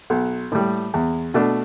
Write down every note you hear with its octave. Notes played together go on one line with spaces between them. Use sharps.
B1
A2 G3
E2
B2 A3 D4